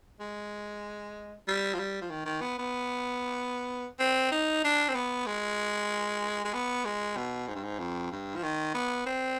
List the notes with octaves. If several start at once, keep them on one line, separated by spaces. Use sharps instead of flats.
G#3
G3
F3
G3
F3
D#3
D#3
B3
B3
C4
D#4
D4
C4
B3
G#3
G#3
B3
G#3
B2
G#2
G2
G#2
F2
G2
F3
D#3
B3
C4